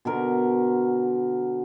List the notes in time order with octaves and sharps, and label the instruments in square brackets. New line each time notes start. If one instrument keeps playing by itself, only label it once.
[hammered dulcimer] B2 D3 A#4